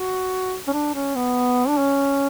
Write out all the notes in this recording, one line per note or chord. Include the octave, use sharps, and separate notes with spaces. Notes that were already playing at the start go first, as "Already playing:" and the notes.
Already playing: F#4
C#4
D4
C#4
B3
D4
C#4